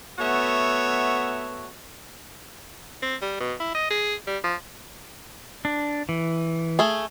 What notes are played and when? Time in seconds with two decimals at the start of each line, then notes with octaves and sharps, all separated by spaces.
0.19 A3 B3 F#4 C#5 E5
3.02 C4
3.22 G3
3.40 B2
3.60 E4
3.75 D#5
3.90 G#4
4.27 G3
4.44 F3
5.65 D4
6.09 E3
6.79 A3 G#4